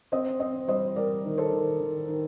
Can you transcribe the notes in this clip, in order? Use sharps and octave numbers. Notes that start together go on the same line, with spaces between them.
C4 C5 D#5
C4 C5 D#5
G3 C5 D#5
G3 A#4 D5
D#3
A4 C5
D#3
D#3
D#3